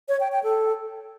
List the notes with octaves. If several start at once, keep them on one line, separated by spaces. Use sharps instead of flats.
C#5
G5
G5
A4